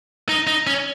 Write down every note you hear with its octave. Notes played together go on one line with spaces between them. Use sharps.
D#4
D#4
C#4